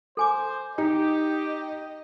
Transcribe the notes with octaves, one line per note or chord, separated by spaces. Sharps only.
A4 C5 G#5 D6
D#4 G4 D#5